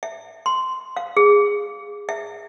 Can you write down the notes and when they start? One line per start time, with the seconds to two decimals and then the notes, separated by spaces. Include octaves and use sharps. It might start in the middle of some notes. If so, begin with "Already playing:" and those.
0.03 E5
0.46 C6
0.96 F5
1.17 G#4
2.09 E5